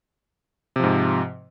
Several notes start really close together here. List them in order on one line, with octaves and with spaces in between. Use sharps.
C3 F3 G#2